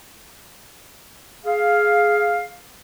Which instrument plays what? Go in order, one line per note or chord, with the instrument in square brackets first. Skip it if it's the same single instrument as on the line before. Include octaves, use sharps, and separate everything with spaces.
[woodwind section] G#4 F5